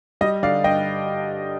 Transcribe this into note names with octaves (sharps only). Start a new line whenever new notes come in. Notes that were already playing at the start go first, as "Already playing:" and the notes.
G3 D#5
D3 D5 F5
G2 D#5 G5